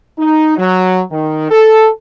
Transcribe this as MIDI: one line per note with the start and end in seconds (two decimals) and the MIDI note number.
0.18 0.57 63
0.57 1.01 54
1.10 1.49 51
1.50 1.87 69